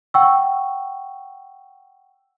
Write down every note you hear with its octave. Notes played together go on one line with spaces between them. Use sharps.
F#5 G5 C#6 E6